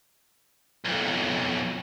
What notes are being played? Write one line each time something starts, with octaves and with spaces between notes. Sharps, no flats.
B1 F2